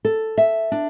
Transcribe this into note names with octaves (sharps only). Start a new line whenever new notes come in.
A4
E5
D4